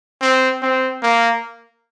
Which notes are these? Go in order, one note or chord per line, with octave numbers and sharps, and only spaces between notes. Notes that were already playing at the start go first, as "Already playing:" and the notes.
C4
C4
A#3